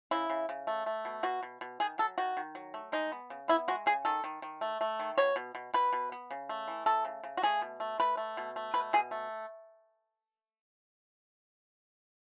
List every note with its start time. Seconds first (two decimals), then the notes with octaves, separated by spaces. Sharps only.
0.11 C#3 E4
0.30 C#3
0.49 C#3
0.67 A3
0.86 A3
1.05 B2
1.23 B2 F#4
1.43 B2
1.61 B2
1.80 D#3 G#4
1.98 F#3 A4
2.18 D#3 F#4
2.37 D#3
2.55 F#3
2.74 A3
2.92 G#3 D#4
3.12 B3
3.30 C#3
3.48 B3 E4
3.68 G#3 F#4
3.86 C#3 G#4
4.05 D#3 A4
4.24 D#3
4.42 D#3
4.61 A3
4.81 A3
5.00 D#3
5.18 B2 C#5
5.36 B2
5.55 B2
5.74 B2 B4
5.93 B2
6.12 B3
6.31 C#3
6.49 A3
6.68 E3
6.86 A3 A4
7.05 C#3
7.23 C#3
7.37 F#4
7.43 A3 G#4
7.62 B2
7.80 A3
8.00 A3 B4
8.17 A3
8.37 B2
8.56 A3
8.74 B2 B4
8.93 B2 G#4
9.11 A3